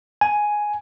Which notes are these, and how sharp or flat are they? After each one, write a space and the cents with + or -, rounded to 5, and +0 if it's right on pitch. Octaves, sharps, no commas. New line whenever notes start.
G#5 +5